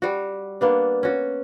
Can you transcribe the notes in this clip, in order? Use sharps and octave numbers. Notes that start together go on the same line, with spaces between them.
G3 F#4
A#3 B3 D4
C#4 F#4